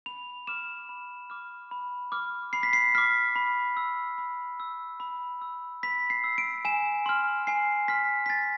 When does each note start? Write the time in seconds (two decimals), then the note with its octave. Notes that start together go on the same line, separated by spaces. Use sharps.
0.06 B5 F7
0.47 D6 F6 E7
0.89 B5
1.30 D6 F6
1.71 B5
2.12 D6 F6
2.53 B5 C7
2.63 B6
2.73 C7
2.95 D6 F6 B6
3.36 B5
3.77 E6
4.18 B5
4.60 E6
5.00 B5
5.42 E6
5.83 B5 B6
6.10 C7
6.24 E6
6.38 D7
6.65 G#5 E7
7.06 C6 F6
7.47 G#5 C7
7.88 C6 F6 B6
8.26 B6
8.29 G#5 A6